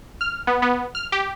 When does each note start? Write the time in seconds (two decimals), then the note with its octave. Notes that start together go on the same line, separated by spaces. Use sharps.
0.21 F6
0.47 B3
0.62 B3
0.95 F6
1.12 G4